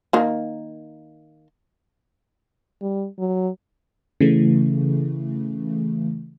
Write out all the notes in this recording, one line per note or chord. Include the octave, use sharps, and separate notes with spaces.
D#3 A#3
G3
F#3
C#3 E3 A3